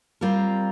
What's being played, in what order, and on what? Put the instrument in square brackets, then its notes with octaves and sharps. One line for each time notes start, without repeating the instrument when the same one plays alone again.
[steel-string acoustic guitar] G3 C4 F4 A#4